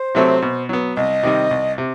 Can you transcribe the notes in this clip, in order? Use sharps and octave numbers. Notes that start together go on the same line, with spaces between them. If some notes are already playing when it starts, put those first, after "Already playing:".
Already playing: C5
C3 F#3 A3 C4
B2
F#3 B3
C2 D#5
C3 D#3 G3
C2
C3